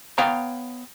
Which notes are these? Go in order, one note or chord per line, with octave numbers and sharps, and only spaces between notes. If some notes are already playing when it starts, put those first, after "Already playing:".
B3 C#5 F5 G5 A#5